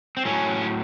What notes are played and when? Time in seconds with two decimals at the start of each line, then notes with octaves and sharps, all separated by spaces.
0.17 C4
0.25 A2 F#3 C#4